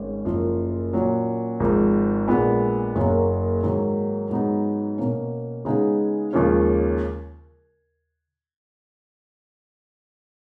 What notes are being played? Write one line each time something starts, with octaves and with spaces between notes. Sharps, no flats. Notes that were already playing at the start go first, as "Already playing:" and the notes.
Already playing: G#1 G#2 C#4
F#1 F#2 F3
A#2 F#3 C#4 F#4
G#1 G#2 F3
A#1 A#2 G#3 B3
F#1 F#2 C#3 F#3 A#3
G#2 D#3 F#3 A#3
G#2 F#3 B3 D#4 G#4
B2 A#3 C#4
C#3 G#3 B3 D#4 G#4
D#2 C#3 F3 G#3 C#4